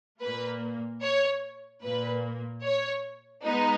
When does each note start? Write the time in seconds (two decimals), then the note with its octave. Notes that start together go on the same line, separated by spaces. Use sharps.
0.22 A#2 A#3 B4
1.03 C#5
1.83 A#2 A#3 B4
2.64 C#5
3.45 G#3 B3 D#4